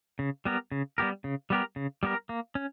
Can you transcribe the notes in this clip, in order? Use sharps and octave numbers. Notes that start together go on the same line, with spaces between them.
C#3
G3 B3 G4 A#4
C#3
G3 B3 G4 A#4
C#3
G3 B3 G4 A#4
C#3
G3 B3 G4 A#4
A#3
C#4